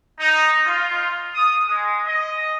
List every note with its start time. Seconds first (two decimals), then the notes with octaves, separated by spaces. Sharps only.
0.19 D#4
0.64 F4
1.34 D#6
1.68 G#3
2.05 D#5